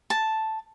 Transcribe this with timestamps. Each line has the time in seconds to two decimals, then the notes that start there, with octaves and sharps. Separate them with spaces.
0.10 A5